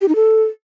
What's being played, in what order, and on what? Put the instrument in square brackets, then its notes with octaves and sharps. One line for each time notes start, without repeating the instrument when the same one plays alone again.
[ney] G4
D#4
A4